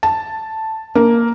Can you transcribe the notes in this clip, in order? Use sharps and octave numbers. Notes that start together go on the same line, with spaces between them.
A5
A#3